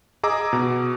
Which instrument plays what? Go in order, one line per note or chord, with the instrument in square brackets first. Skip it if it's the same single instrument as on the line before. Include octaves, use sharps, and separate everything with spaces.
[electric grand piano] G#4 D#5 A#5 D6 E6
B2